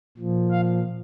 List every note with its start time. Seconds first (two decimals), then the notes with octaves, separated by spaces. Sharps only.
0.17 A#2 F3
0.51 F5